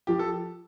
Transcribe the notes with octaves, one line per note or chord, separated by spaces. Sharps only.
F3 G4
A4